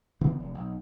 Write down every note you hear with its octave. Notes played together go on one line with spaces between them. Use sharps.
C#3 E3 B3 C4
F1
B1